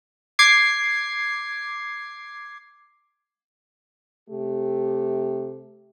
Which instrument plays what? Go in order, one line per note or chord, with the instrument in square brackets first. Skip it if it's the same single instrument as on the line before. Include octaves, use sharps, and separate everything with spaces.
[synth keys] D6 G#6 C7
[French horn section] C3 A3 G4